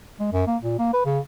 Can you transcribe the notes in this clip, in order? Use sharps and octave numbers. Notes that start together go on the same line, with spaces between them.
G#3
F#2
A#3
A#2
A#3
B4
C#3